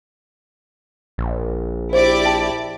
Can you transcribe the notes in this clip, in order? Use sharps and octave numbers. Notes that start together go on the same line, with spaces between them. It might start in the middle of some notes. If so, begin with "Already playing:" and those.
A#1
E4 G4 C5 D5
G5 A5